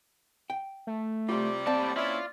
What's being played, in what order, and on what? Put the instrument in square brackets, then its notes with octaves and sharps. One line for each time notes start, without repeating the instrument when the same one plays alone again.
[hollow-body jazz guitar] G5
[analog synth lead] A3
[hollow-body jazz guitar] C2 F4 [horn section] C3 G3
[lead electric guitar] A2 A5 [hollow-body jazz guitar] A#3 C4 [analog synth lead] D5
[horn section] C#4 E4 [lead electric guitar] F4 [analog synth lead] D5